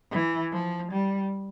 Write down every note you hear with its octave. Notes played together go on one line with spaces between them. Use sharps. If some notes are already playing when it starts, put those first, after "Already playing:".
E3
F3
G3